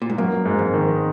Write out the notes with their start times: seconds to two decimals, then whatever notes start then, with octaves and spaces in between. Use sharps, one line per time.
0.02 A#2
0.10 G#2
0.18 F#2 A#3
0.45 G#2
0.59 F2
0.74 D#3